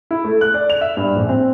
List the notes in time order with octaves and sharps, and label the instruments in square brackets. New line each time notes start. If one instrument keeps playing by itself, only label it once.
[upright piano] E4
A3
F#6
D5
F7
E5
G2
A#1
C4